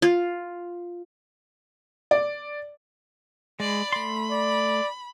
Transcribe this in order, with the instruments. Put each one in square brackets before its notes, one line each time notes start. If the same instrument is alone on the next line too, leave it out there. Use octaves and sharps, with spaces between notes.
[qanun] F4
[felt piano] D5
[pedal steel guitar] G#3 [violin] D5 B5
[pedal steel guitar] A3 C6 [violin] B5
[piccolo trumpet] D5